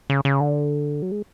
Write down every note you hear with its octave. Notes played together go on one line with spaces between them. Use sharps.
C#3
C#3
D3
F#3
G#3